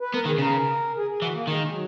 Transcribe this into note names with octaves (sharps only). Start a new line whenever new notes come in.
B4
B3 A#4
D#3
G#4
C#3 A#4
G#4
G#4
E3 F#4
A#3
D#3 G#3
F#3